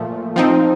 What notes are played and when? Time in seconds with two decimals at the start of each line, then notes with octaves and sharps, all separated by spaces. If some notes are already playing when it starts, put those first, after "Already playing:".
Already playing: A#2 F3 A3
0.36 F3 C4 D#4